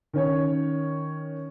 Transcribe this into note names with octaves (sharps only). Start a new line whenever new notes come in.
D#3 C#4 C#5